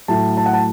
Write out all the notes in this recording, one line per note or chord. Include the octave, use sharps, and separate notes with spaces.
A2 F#3 A3 A5
A5
F#5
A5